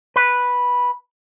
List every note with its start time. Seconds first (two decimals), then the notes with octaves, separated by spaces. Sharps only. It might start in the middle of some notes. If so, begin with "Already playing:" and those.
0.16 B4